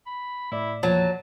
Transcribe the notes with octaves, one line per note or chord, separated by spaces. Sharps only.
B5
A2 E4 D5
E2 A#2 F3 F#3 A5